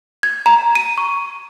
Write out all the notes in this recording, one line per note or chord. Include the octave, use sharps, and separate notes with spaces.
G#6
A#5
D#7
C#6